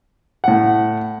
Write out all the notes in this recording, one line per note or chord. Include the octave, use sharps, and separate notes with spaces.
A2 F#5